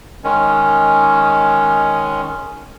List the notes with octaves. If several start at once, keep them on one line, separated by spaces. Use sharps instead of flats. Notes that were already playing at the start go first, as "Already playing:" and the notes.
D#3 G#3 C#4